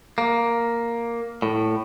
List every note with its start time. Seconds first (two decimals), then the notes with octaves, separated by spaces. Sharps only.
0.18 A#3
1.42 A2